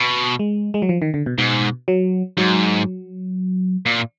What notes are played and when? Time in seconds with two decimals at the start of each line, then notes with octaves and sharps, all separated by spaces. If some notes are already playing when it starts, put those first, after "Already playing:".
Already playing: B2
0.39 G#3
0.74 G#3
0.82 F#3
0.89 F3
1.02 D#3
1.14 D3
1.26 B2
1.38 G#2 B2
1.88 F#3
2.37 G#2 F#3
3.86 A#2